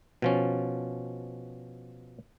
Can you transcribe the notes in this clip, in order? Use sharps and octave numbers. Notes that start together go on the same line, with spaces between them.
B2 F3 C#4